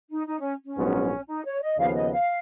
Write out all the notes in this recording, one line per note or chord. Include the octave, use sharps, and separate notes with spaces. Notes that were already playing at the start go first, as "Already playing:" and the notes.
D#4
D#4
C#4
C#4
A#1 G#2 F#3 B3
D#4
C#5
D#5
D#2 C#3 F3 B3 F5
D#5
F5